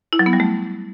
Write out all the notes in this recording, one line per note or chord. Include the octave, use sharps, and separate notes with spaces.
E4
F#3
B3
G3
A3